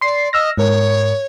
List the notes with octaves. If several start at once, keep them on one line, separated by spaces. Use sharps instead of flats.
D5 C6 C7
D#5 E6 F6 A#6
G#2 A#4 C#5